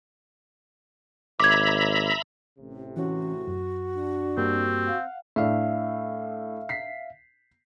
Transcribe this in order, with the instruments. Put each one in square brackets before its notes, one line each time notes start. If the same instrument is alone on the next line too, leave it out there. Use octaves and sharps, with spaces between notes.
[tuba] G#1 [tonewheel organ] E5 A#5 B5 [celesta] D6 G#6
[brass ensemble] A1 A2 C3
[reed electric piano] E3 C#4 [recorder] F#4
[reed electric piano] F#2
[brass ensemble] D4
[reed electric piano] G2 A#3 G4 [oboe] C4
[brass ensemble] F5 F#5
[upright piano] A2 D4 [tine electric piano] E5 F5
[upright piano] B6 C7